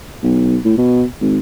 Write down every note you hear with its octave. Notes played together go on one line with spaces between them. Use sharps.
B1
A2
B2
G#1